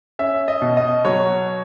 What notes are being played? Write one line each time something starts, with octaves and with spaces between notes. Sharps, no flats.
C#4 E5
D#5
B2
D#5
F#3 C#5